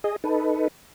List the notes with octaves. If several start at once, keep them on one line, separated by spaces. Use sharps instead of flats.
G#4 D#5
D#4 A4 B4